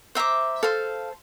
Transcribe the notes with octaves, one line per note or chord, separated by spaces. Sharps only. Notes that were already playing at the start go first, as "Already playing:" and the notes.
C5 E5 A#5 D6
A4 C5 F5